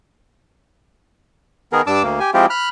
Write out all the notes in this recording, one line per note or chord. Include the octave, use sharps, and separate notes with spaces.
D#3 B3 G#4 A#4
G2 D4 A5 D6 E6
D2 A#3
G4 G#5
F3 G#3 C4 E4 F4 G4
B5 F6 F#6